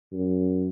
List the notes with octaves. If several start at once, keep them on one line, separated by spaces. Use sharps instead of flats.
F#2